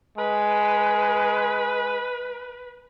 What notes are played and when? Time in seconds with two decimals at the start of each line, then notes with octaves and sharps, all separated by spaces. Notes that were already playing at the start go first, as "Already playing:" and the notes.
0.18 G#3 B4